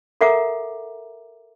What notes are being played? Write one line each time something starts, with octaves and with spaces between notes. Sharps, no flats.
A4 A#4 E5 F#5 A#5 D6